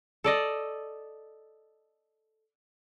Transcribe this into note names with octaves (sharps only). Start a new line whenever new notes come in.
A4 D5 D#5